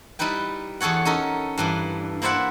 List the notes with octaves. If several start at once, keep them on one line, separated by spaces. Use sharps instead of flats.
G3 D#4 E4 B4 G5
E2 G#4 A4 C#5 F#5
C#4 D#4 A4 A#4
G2 E3 D4
A#3 E4 C5 D5 E5 F#5